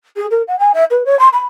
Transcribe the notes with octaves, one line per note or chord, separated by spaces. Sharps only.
G#4
A#4
F#5
G#5
E5
B4
C#5
C6
B5